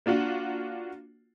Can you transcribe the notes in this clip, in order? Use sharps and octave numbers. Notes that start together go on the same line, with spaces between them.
A#3 D4 F4 F#4